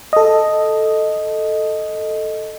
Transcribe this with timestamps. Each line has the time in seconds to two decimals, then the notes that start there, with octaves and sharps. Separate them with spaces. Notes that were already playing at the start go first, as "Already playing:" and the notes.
0.13 A4 D#5